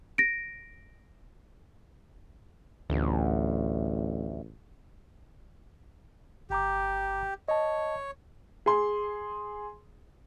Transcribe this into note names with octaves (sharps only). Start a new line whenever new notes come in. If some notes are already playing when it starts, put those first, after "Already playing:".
A#6 D7
A1 D2
G1 G4 A#5 D6
C#5 D#5 A5
G#4 C6